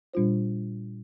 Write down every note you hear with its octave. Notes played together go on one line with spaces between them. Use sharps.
A#2 G3 D4 F4 C5